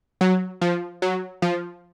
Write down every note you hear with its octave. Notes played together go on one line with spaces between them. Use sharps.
F#3
F3
F#3
F3